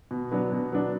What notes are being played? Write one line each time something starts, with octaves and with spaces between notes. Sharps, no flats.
B2
F#3 B3 D4
B2
F#3 B3 D4